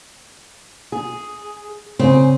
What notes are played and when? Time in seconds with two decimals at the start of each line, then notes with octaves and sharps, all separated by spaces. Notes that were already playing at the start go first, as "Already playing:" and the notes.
0.92 G#4
1.99 C#3 C4 E5 G#5